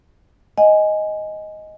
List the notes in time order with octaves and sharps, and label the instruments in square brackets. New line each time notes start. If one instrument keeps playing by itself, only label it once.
[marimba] D#5 F#5 G#5